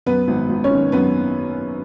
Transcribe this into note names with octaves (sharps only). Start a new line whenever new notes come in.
F#2 B3 B4
G#1
G#1
C#4 C#5
D#3
F#2 B3 B4